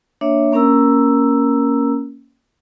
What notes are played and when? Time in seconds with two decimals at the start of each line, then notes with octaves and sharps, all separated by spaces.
0.21 A#3 D4 C#5 E5
0.52 A#3 C#4 A#4 A#5 E6